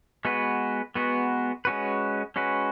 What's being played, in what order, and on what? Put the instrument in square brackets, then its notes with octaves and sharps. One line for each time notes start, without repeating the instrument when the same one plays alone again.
[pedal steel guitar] G#3 B3 F#4 B4
G#3 B3 F#4 B4
G#3 C#4 F#4 B4
G#3 C#4 F#4 B4